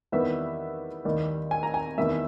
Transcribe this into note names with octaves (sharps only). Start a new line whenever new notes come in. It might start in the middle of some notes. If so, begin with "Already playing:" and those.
E2 D#3 G3 B3 E5
D#2 D#3 G3
G#5
A#5
G#5
E2 D#3 G3 E5